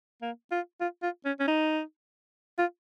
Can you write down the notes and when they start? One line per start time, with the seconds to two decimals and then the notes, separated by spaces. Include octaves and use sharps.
0.22 A#3
0.51 F4
0.80 F4
1.03 F4
1.25 C#4
1.40 C#4
1.48 D#4
2.58 F4